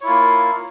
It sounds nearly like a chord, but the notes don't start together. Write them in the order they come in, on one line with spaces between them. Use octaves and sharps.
C#5 E4 F4 A#3